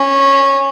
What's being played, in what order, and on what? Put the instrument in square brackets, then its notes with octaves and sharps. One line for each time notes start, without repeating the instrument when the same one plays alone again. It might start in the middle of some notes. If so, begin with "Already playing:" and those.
Already playing: [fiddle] C#4